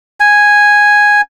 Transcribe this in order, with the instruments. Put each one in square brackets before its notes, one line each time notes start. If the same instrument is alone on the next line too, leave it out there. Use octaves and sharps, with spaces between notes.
[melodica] G#5